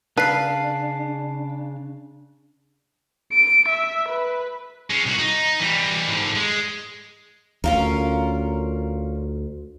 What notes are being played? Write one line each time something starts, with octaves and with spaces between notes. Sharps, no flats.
C#3 D4 B4 F5 A5 F6 C7
D7
E5
B4
G#3 C#4
C2 F#4
D#4
E3 G3
G#2 D3
G#3
D2 C#4 F4 A#4